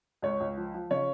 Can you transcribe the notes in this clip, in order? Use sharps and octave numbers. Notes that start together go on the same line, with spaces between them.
C#2 C#5
C#2
F3
F3
C#3 C#5